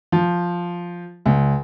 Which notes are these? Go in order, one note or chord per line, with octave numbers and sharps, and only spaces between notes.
F3
C#2